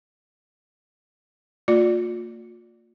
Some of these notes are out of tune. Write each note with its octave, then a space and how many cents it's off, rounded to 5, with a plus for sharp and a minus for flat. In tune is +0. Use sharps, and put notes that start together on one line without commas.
A#3 -40 F4 +35 D5 +0